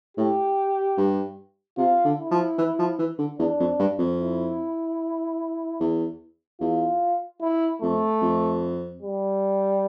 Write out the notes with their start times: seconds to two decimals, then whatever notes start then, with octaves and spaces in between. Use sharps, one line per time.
0.17 A2 G4
0.98 G2
1.78 C3 F4
2.05 D3
2.18 E4
2.31 F3
2.58 E3
2.79 F3
2.99 E3
3.18 D3
3.39 E2 D4
3.59 F2
3.79 G2
3.99 F2
4.20 E4
5.80 E2
6.60 E2 F4
7.41 E4
7.81 F2 A3
8.22 F2
9.02 G3